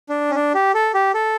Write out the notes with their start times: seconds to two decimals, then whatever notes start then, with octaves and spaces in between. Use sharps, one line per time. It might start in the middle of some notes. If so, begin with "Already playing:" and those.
0.09 D4
0.31 C#4
0.35 D4
0.54 G4
0.74 A4
0.94 G4
1.14 A4